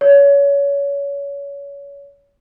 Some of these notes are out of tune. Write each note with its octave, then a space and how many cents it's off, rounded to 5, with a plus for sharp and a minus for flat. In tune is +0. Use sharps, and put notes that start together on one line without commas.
C#5 +25